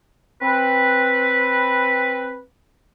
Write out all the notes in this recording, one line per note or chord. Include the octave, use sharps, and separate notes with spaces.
C4 B4